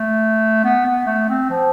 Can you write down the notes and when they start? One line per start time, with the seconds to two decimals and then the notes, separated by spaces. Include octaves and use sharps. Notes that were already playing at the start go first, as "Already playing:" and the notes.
Already playing: A3
0.64 B3
0.86 B3
1.07 A3
1.29 C4
1.50 F3